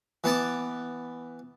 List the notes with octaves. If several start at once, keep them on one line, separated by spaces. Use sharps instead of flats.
E3 B3 A5 D6